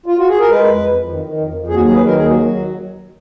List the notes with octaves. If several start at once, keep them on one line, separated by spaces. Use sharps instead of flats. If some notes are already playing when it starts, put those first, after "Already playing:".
F4
F#4
G#4
A#4
G#3 B4
F2
F2
F2
D#3
D#3
F2
F2
D#2 G#4
F#4
F#3 G#4
D#3 B4
A#4
D#2 G#4
F#3 F#4
F#3
D#3